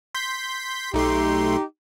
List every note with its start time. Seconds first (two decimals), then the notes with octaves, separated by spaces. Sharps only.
0.15 C6 G6 B6
0.94 B1 A3 D#4 G4 C6